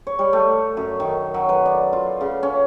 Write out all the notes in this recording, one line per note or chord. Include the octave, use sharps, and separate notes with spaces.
C#5
G3
A3
F#2
D#3
F#3
B4
D5
F4
C#3
C#4